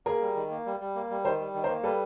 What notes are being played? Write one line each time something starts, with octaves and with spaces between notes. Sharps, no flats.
A#3 G#4 A#4
G3
D#3
A#3
G3
G3
A#3
G3
D#3 A#4 C5
G3
D#3
A#4 C5
A#3
G3 A4 B4